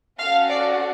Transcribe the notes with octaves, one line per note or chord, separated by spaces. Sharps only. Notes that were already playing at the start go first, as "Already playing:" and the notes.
C#4 F#4 A4 F5
D5